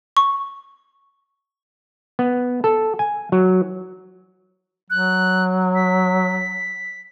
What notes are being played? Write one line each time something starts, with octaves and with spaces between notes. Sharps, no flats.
C#6
B3
A4
G#5
F#3
F#3 F#6
B6